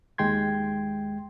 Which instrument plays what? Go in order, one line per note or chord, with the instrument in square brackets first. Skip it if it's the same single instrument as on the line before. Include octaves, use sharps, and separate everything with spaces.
[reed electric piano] D#2 G#3 G5 C6 G#6